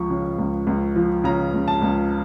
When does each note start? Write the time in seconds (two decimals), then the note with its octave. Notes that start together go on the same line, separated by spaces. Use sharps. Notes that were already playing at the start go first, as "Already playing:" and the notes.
Already playing: C#2 F3 C#6
0.10 C#3
0.38 C#2
0.67 C#2
0.96 F3
1.24 C#3 A#5
1.53 C#2
1.68 A5
1.82 C#2